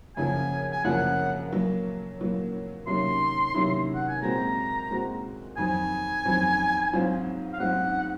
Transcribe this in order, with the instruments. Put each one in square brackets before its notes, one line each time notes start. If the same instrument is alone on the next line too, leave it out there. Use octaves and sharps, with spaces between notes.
[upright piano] F#2 C#3 F3 A#3 [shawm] G#5
[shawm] G#5
[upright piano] F#2 C#3 F3 A#3 [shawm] F#5
[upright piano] A#2 F#3 A#3
A#2 F#3 A#3
[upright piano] C3 D#3 F#3 A#3 C#4 [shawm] C6
[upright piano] C3 D#3 F#3 A#3 C#4
[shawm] F#5
G#5
[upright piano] A#2 G#3 C4 F#4 [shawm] A#5
[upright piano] A#2 G#3 C4 F#4
[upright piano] F2 D#3 F#3 C4 [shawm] G#5
[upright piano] F2 D#3 F#3 C4
G#2 F#3 C4 F4
[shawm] F5
[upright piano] G#2 F#3 C4 F4 [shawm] F#5